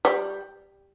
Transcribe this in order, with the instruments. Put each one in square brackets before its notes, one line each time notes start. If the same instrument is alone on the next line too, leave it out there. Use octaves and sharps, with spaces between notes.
[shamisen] G3